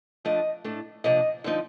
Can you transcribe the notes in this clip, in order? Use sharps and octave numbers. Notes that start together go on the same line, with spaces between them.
F3 A3 D4 D#5
A2 A3 D4
C3 F3 A#3 D4 D#5
D3 F3 C4 D#4